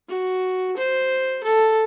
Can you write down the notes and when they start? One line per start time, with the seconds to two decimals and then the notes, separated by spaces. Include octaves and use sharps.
0.08 F#4
0.77 C5
1.44 A4